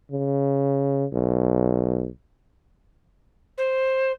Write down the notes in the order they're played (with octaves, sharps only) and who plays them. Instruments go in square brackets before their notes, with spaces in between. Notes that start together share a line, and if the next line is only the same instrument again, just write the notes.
[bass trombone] C#3
B1
[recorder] C5